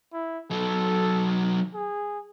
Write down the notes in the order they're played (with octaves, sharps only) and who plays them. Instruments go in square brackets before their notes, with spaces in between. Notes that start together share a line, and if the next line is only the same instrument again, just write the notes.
[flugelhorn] E4
[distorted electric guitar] F#3 D#4 [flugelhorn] A4
[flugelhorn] G#4